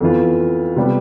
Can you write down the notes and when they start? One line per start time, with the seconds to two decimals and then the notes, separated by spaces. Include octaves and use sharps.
0.01 F2 E3 B3 F4
0.76 C3 G3 B3